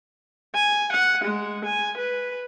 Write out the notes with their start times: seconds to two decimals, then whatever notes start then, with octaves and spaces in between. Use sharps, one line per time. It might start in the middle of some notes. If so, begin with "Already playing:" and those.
0.54 G#5
0.93 F#5
1.25 G#3
1.66 G#5
1.98 B4